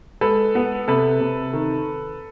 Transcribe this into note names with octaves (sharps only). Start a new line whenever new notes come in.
G#3 A4 B4
B3
C3 A4 B4
C3
D#3